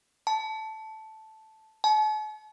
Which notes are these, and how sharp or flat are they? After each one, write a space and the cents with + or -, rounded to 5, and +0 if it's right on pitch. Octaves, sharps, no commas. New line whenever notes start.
A5 -5
A5 -45